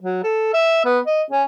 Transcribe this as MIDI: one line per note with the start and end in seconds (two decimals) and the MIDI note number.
0.02 0.20 54
0.24 0.52 69
0.54 0.80 76
0.85 0.99 59
1.06 1.22 75
1.30 1.44 61